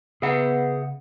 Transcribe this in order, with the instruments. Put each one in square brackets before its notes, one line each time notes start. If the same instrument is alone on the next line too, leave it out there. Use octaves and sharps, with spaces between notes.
[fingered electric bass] C#3 [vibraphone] B3 B4 [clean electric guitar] G#4 E5 F#5